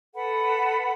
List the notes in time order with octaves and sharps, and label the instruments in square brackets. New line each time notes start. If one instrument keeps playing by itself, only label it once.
[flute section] A4 B4 F#5 B5